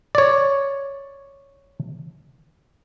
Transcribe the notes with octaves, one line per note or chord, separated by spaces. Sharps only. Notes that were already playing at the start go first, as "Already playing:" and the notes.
C#5 D5